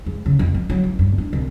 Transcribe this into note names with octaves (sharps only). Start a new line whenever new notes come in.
G#2
C#3
F2
F3
F#3
A1
G2
D4
C2